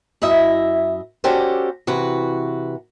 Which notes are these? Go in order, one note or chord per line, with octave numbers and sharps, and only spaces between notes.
F#2 E4 D#5 E5
C#4 D4 F#4 G4 A4 C5
C3 E3 F#4 B4